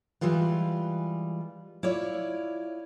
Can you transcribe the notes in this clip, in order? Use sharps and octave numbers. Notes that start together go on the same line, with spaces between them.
E3 G3 G#3 F4 B4
E4 F4 C#5 D5